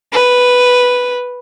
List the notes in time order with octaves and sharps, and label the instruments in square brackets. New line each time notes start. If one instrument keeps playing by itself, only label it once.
[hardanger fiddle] B4